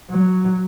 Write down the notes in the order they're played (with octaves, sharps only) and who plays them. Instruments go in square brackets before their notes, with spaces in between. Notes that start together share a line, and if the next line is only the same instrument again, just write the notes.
[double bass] F#3